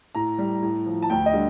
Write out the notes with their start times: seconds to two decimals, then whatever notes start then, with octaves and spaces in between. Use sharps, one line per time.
0.15 A2 A#5
0.38 G3
0.62 A2
0.86 F3
1.02 A5
1.10 D2 G5
1.26 D#5
1.33 D3 G3